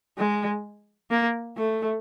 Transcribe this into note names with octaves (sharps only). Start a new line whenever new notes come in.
G#3
A#3
A3